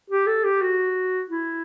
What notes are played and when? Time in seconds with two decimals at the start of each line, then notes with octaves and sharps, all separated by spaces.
0.10 G4
0.27 A4
0.44 G4
0.61 F#4
1.29 E4